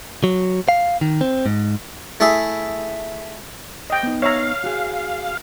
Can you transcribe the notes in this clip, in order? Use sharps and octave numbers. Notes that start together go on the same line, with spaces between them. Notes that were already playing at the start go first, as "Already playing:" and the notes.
F#3
F5
D#3
C4
G#2
A3 E4 G#4
D#5 G5
B3 D#4
C#5 E5 F5 A#5
F#4 G#4